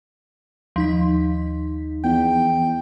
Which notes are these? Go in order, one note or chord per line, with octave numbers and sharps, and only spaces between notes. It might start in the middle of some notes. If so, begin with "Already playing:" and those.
D#2 F3 D#4 B6
E2 G5